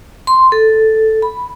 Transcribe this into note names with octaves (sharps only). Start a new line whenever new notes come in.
C6
A4
B5